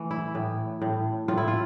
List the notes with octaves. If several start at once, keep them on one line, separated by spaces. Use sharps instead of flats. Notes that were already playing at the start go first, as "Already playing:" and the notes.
Already playing: E3 A3
E4
A2
A2
A2 F4
E4
F4